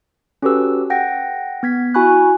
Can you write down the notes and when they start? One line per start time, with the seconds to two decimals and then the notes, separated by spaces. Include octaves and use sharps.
0.42 C#4 F#4 G4 A4 B4 E6
0.90 F#5 G5 A#6
1.63 B3 G#6 B6
1.94 E4 F#4 G#5 B5 C#6 F#6